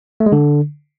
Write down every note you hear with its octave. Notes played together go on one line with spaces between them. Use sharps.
A3
G#3
D3